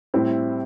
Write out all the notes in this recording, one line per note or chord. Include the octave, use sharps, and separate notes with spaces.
A2 G3 C4 E4